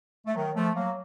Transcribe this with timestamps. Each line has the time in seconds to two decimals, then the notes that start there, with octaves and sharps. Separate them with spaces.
0.27 A3
0.35 D#3 F#3
0.55 F3 A3
0.75 F#3 A#3